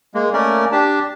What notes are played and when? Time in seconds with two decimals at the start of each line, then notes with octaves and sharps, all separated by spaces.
0.14 G#3 A#3
0.33 A3 A#3 C#4 A#4 D5
0.72 D4 G4 A5